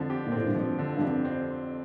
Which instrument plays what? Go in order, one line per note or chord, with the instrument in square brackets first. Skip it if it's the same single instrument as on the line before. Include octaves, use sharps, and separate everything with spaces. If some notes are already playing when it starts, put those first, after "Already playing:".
Already playing: [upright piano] F2 [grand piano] D3 F3
[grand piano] G4
[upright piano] A#2
[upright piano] A2 [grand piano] C4
[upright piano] G2
[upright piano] F2 [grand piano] F3
[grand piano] D3
[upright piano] G2
[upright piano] F2 [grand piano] G4
[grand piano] C4